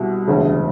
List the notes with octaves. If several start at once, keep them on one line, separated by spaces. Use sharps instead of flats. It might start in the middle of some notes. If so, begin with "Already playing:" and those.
Already playing: C2 B2
E1 D2 C#3